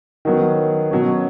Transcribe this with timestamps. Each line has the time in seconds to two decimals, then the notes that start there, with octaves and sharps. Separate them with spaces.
0.25 D#3 F#3 B3
0.91 B2 F#3 C#4